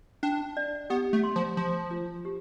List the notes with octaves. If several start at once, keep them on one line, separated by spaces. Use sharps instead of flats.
D4 G5
D5
B3 G4
A3
C6
F3
F3 C6
F4
G4